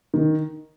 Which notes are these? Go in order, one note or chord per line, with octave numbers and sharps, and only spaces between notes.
D#3